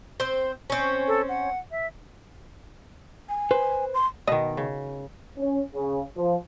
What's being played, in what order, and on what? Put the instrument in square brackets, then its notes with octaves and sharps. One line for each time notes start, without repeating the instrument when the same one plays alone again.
[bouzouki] C4 C5
C4 C#4
[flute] A4
F#5
E5
[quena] G#5
[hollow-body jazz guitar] B4 C5
[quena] C6
[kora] B2 D#3 [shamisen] D#5
[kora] C#3
[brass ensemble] C#4
C#3
F3